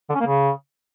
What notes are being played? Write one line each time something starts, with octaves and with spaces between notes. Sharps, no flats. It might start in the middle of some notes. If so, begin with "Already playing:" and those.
D3
C#4
A#3
C#3